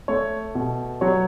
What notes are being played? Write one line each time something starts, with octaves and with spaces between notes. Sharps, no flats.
A3 C#5
B2
F#3 C#5